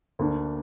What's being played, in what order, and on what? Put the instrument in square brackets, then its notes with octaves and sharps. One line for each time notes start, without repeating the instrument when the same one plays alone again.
[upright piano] D2 D3 A#3 D4